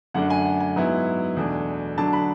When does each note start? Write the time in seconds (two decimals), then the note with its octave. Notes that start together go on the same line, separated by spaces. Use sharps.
0.14 F#2 D3 A3 D4 F#5
0.30 G#5
0.45 F#5
0.60 G#5
0.76 G#2 F#3 B3 E4
1.37 E2 B2 A3 D4
1.98 D3 F#3 A3 D4 A5
2.13 B5